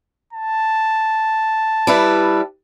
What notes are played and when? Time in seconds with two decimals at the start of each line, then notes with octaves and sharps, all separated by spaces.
0.33 A5
1.87 G3 E4 B4